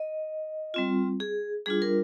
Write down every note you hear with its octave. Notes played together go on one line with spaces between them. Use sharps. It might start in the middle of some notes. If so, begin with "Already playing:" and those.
Already playing: D#5
G3 C4 F4
G#4
G3 D4 F4 G#4
A#4